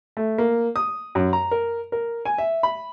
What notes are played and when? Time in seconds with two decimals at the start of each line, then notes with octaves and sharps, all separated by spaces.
0.17 A3
0.38 A#3
0.76 D#6
1.15 F#2
1.33 A#5
1.51 A#4
1.92 A#4
2.25 G#5
2.38 E5
2.63 B5